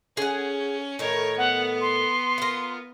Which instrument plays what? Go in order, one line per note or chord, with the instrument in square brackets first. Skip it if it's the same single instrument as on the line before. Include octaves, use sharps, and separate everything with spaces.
[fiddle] C#4 [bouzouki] G#4 F#5
[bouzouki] A2 D#3 [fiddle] A#4 C#5
[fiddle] B3 [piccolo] F#5
[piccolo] C6
[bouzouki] F4 A#4